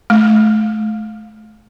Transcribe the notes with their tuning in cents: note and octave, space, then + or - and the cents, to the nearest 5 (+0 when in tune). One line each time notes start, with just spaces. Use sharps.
A3 -35